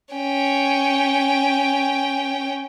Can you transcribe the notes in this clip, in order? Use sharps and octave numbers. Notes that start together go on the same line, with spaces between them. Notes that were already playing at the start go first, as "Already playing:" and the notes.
C#4 G5